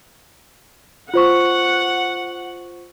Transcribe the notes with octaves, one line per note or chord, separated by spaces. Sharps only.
F4 C5 F#5 C#6